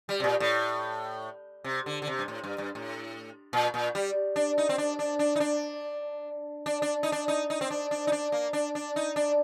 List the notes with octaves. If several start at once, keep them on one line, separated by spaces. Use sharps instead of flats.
G3
C3
A#2
A2
C3
D3
D3
C3
G2
A2
G2
G2
A2
A#2
A#2
G3
D4
D#4
C4
D4
D4
D4
D#4
D4
D4
D4
D#4
D4
D#4
D#4
C4
D4
D4
D#4
D4
A#3
D4
D4
D#4
D4